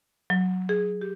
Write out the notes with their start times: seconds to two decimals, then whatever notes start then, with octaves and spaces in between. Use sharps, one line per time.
0.30 F#3
0.69 G#4
1.01 G4